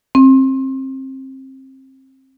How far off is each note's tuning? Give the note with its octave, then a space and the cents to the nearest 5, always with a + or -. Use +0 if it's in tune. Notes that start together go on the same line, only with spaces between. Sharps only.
C4 +25